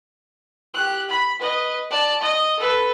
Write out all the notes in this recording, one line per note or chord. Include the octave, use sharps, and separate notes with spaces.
G4 F#6
B5
B4 D#5
D5 A5
D#5
A4 B4